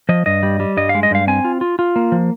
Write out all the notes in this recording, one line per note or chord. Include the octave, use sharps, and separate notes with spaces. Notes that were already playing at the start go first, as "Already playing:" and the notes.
F3 D#5
G2 D#5
G3
G3
G2 D#5
F5
G#3
D#5
G2 F5
C4 G#5
F4
F4
F4
A#3
F3